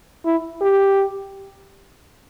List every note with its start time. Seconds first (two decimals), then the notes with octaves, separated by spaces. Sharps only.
0.25 E4
0.61 G4